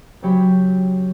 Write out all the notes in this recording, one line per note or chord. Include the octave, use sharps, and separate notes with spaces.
C#3 F#3 G4 C#5 G5 B5